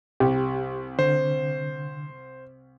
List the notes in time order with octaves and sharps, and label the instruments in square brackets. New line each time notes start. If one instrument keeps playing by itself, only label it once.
[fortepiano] C2 [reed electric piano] G4
[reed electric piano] D3 [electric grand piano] C5